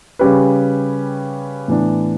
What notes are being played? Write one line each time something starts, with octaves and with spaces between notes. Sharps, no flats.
C#3 G3 C#4 G4 B4
A2 E3 B3 D4